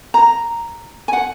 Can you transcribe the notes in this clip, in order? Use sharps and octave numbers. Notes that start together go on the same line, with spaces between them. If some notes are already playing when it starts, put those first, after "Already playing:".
A#5
G#5
F#5